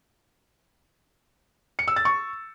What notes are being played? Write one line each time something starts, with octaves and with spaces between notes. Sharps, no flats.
C#7
E6
A6
C#6